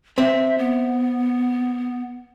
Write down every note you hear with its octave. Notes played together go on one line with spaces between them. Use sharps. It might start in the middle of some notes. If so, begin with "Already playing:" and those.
C4 E5
B3